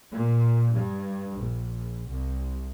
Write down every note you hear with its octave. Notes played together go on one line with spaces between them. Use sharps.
A#2
G2
A#1
C2